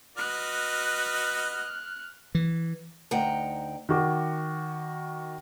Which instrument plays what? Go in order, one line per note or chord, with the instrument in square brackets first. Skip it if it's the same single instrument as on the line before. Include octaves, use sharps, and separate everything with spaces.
[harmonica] F#4 B4 D#5 [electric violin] F6 F#6
[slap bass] E3
[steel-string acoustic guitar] D2 D#4 F#5 G5 A#5
[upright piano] D#3 F#4 D6